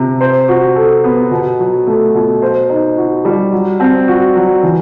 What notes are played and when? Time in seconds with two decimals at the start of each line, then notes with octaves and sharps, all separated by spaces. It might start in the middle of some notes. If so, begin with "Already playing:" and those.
Already playing: C3
0.21 C5
0.48 F#4
0.76 A4
1.04 B3
1.31 B2
1.59 F#3
1.87 A3
2.14 B2
2.42 C5
2.69 D#4
2.97 F#4
3.25 G3
3.52 F#3
3.80 C4
4.08 F#4
4.35 F#3
4.63 E3